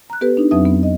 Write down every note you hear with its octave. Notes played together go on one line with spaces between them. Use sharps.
A#5 F#6
B3 G4 A4 B4
D4 D#4
F2 F#3 C4 B4 E5 D#6
B3
D#5